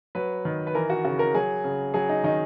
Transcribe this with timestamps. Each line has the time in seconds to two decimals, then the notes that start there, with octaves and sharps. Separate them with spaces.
0.15 F#3 B4
0.45 D#3
0.67 B4
0.75 E3 A#4
0.90 F#4
1.04 C#3 F#4
1.19 A#4
1.35 F#3 G#4
1.64 C#3
1.94 F#3 G#4
2.09 D#4
2.24 D#3 D#4